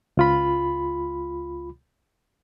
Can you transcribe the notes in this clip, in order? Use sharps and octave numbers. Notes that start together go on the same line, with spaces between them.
C#2 F4 B5